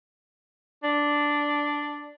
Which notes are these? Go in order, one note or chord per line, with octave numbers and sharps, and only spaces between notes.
D4